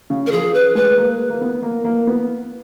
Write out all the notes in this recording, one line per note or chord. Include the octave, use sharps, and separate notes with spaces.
C#3
A#4
F3 G#4
B4
G#3 B4
A#3
A#3
B3
A#3
A#3
B3